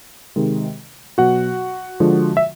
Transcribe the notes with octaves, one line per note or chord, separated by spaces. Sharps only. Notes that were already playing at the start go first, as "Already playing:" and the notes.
C3 D#3 G#3
B2 F#3 F#4 F#5
D3 F3 G#3
E5